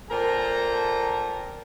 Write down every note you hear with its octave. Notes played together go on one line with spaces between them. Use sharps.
A#2 A4 A#4 C5 G5 A#5